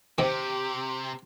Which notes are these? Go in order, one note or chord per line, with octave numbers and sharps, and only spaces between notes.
C3 D#3 C4 G4